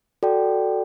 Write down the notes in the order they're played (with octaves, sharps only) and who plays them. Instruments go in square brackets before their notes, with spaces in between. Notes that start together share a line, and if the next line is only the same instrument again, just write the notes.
[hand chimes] F#4 A4 D5 G5